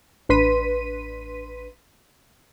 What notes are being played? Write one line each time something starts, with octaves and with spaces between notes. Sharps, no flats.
A1 D4 B4 C6 B6 D#7